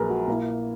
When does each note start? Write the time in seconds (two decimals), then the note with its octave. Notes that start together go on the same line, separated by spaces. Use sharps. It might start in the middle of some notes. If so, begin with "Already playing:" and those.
Already playing: A#1 A#2 F#3 G#4 A#4 B4
0.10 F#4
0.28 A#2 A#3 E4